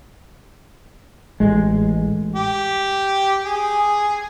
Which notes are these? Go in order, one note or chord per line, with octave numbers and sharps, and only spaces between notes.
A1 G#3
G4
G#4